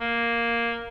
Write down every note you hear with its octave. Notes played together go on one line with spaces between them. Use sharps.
A#3